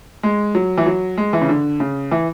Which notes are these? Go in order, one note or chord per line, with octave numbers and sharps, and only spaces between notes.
G#3
F#3
E3
F#3
G#3
E3
C#3
D3
C#3
E3